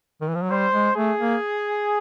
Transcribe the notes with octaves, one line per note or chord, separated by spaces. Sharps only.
D#3
E3
F3
F#3
G3 C5
G#3
A3 G#4
A#3